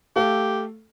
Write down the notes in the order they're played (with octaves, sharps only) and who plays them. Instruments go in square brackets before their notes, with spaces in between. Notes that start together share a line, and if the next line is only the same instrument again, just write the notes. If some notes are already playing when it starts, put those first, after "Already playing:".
[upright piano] A3 A4 F5 [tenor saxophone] G4